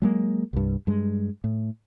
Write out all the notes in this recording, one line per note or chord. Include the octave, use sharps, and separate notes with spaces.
F#3 G#3 A#3
C2 G2
G2 G#3
A2